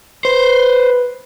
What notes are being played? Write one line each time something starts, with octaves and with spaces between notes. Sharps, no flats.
B4 C5